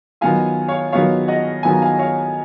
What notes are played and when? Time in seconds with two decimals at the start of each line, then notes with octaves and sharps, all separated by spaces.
0.21 D#3 F#3 B3 F4 F5 G#5
0.68 C#5 F5
0.92 D#3 F#3 B3 F4 C#5 F5
1.28 D#5 F#5
1.63 D#3 F#3 B3 F4 G#5
1.73 A#5
1.82 F5 G#5
1.99 C#5 F5